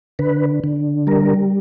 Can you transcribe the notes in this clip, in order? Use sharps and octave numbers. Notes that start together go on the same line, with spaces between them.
D3 B4
D3
G3 A#4